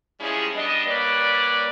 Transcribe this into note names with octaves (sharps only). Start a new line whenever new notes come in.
F3 G3 G#3 C#4 E4 G#4
G3 B3 D4 D#5
G3 A#3 B4 C#5 D5